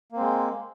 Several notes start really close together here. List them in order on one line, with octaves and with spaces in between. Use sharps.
A#3 C4 G#3